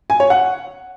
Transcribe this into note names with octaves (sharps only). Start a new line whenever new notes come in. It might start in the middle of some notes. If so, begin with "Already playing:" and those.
G#5
C#5
F#5